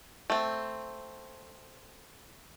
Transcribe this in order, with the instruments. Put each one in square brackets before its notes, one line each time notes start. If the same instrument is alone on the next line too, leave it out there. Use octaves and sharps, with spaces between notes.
[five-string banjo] A3 C4